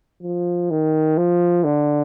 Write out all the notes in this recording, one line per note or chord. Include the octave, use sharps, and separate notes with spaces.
F3
D#3
F3
D3